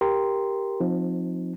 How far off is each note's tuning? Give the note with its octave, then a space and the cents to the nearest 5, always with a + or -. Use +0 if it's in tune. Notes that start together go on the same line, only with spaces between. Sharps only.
G4 +0 A#4 +5 C6 -5
F3 +25 C4 +0 D#4 +0